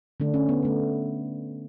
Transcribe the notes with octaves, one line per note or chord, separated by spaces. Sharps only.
D3 A3 D4
C#4
B3
D3 A3